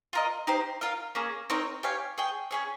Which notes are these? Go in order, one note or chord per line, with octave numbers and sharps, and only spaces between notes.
F4 A#4 D#5
D#4 G4 C5
F4 A#4 F5
A#3 C#4 G#4
C4 D#4 A#4 C#5
G4 C#5 F5 G#5
G#4 C#5 G5
C#4 G#4 C#5